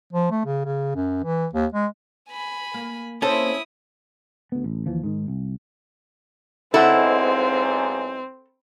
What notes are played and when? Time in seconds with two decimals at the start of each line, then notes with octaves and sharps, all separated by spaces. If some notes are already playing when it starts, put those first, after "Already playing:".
0.13 F3
0.31 A3
0.46 C#3
0.65 C#3
0.95 F#2
1.24 E3
1.54 D#2
1.74 G#3
2.30 G#5 B5
2.74 A#3
3.22 A#3 C4 C#4 E4 A4 C5 D#6
4.52 D2 B3
4.64 A1
4.86 D#2 E3 F3
5.03 G#2 D#3
5.28 C2
6.74 B1 G#2 C4 E4 A4 F#5